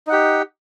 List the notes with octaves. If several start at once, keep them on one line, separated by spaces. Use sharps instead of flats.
D#4 G4 F#5